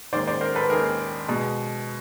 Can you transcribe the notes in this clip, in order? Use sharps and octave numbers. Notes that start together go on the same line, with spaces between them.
D#2 D#3 G#3 C5 D5
C5 D5
A#4 C5
A4 B4
D#2 D#3 G#3 G#4 A#4
B2 G#3